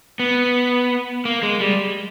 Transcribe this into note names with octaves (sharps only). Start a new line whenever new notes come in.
B3
A#3
G#3
G3